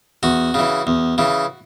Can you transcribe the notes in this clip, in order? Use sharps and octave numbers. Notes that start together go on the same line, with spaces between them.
E2 F#4
C#3 E3
E2
C#3 E3